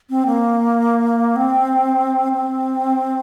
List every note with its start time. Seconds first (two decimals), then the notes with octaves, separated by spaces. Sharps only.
0.10 C4
0.26 A#3
1.36 C4
2.32 C4